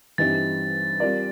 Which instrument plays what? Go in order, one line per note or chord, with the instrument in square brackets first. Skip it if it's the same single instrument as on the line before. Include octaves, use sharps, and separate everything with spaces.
[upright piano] G2 E3 G3 C4 D#4 [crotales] A6
[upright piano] G3 C4 F4 A#4 D5